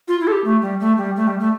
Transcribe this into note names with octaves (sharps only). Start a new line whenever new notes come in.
F4
E4
A4
G4
A3
G3
A3
G3
A3
G3
A3